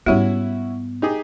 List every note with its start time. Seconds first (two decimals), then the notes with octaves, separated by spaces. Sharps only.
0.06 G#2 G3 B3 C#4 E4 F#4 G4
1.02 D#4 G4 G#4